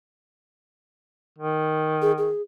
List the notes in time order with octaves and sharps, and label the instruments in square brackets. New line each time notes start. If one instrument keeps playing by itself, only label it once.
[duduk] D#3
[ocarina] G#4
G#4